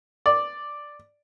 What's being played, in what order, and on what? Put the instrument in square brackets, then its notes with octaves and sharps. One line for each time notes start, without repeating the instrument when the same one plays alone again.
[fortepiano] D5